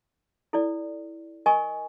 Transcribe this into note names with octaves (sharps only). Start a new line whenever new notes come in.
E4 A4 D5
A#4 D#5 G#5 C#6